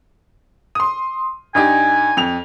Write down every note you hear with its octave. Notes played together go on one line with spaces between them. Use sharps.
C6 D#6
G2 D#4 G4 G#5
F2 F7